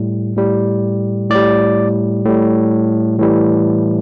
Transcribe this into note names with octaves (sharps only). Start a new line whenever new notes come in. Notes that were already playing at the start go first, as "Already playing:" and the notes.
Already playing: A2 G3
A2 G3
A2 G3 D5
A2 G3
A2 E3 G3